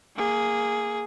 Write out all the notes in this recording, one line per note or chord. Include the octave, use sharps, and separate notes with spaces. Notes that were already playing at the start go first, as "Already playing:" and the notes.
A#3 G#4